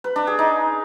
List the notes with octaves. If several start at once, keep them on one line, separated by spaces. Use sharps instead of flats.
B4
D4
G#4
D#4